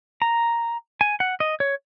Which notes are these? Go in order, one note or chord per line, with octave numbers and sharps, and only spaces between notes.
A#5
G#5
F#5
D#5
C#5